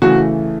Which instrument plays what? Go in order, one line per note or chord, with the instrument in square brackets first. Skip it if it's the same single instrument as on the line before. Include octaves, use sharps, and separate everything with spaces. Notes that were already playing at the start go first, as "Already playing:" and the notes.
[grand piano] C#3 E3 A3 F#4